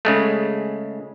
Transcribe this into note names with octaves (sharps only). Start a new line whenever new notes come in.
C#3 G#3 A3